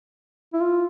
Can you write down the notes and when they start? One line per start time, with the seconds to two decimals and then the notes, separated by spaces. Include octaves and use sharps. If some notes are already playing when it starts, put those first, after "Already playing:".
0.53 E4
0.61 F4